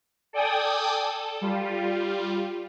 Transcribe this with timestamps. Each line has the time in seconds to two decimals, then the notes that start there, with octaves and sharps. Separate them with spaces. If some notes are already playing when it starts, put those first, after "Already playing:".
0.33 A4 D5 G5 G#5 D#6
1.04 A4
1.41 G3 F4